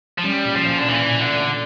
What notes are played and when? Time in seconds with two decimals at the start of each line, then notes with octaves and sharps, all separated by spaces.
0.18 F3
0.23 G3 C#4
0.45 A#2
0.56 F3
0.66 A#2
0.78 D3
0.88 A#2 E3
1.10 A#2
1.21 D3
1.32 A3